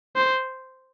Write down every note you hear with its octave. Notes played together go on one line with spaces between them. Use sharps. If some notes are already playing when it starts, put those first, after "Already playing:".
C5